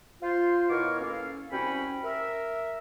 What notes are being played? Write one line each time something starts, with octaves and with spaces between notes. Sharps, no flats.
F4 C5
B2 E4 A#4 C#5 D6 F6
A#3 C#4 A4 F5
C2 C#4 F#4 G5 B5
A#4 E5